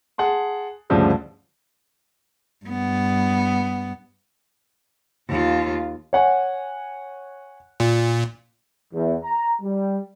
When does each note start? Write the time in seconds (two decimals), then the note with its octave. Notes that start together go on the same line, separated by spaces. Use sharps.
0.18 G#4 F#5 A5 C6
0.90 D2 G2 C#3 F3 G3 G#3
2.66 G2 B3
5.28 D#2 F4
6.13 C#5 F#5 G#5
7.80 A#2
8.94 E2
9.24 A#5
9.62 G3